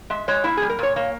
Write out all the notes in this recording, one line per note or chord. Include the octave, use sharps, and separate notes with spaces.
G#3 E5
G#3 C#5
A#3 E4
G3 G#4
A#4
A#2 C#5
A#3 C#5